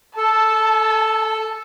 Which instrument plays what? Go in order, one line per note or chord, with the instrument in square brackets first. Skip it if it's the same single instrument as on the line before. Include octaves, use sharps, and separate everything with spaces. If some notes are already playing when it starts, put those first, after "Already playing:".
[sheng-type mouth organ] A4 [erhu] A5